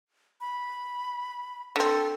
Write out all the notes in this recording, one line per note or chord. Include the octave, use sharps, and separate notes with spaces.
B5
D3 C4 A4